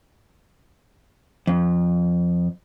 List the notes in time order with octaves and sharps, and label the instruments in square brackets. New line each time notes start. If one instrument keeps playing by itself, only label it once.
[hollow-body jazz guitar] F2